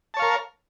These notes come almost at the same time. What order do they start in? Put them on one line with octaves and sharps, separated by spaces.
A5 C#5 F5 A#4